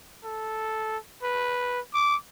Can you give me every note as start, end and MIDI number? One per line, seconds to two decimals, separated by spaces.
0.24 0.97 69
1.23 1.80 71
1.94 2.16 86